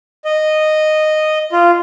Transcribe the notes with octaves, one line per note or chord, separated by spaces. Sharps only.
D#5
F4